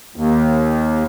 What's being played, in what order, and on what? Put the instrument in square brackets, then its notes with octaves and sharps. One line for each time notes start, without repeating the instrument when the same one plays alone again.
[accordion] D#2